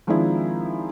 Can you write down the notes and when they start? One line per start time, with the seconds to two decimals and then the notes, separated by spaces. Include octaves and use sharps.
0.07 D#3 F3 G#3 C4 D4 E4